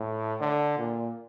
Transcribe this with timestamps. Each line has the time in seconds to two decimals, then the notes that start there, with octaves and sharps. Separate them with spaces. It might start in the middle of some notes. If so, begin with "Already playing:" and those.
Already playing: A2
0.41 D3
0.78 A#2